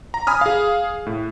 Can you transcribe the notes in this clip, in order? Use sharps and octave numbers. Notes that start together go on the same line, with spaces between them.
A#5
G#5 B5 D#6 F6
G#4 F5
A2